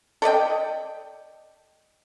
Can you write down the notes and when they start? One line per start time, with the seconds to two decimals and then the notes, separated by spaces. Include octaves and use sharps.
0.22 A4 D5 D#5 G5